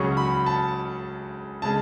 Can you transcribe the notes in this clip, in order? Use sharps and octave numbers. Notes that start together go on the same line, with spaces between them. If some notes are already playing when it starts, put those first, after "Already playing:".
Already playing: C#2 C#3 F#3 C#4 C#6
B5
A5
C#3 G#3 A5